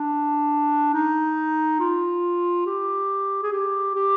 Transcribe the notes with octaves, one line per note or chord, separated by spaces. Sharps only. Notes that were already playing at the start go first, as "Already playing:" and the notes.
Already playing: D4
D#4
F4
G4
G#4
G4
G4